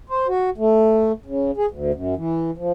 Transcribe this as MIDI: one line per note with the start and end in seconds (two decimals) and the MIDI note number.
0.10 0.27 72
0.28 0.50 66
0.58 1.12 57
1.26 1.51 49
1.57 1.66 68
1.71 1.92 38
1.94 2.15 42
2.17 2.51 52
2.58 2.72 53